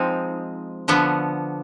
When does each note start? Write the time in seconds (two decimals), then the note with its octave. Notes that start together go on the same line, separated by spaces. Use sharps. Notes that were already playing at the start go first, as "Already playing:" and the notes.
Already playing: F3 G#3 C4 D#4
0.88 D3 F3 B3